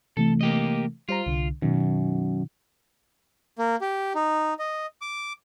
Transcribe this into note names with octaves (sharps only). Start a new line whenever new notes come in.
C3 E3 A3 A4
A#3 G4 D#5
G3 F4 C5 A#5
C2 D3
F#2 B2 D#3
A#3
G4
D#4
D#5
D6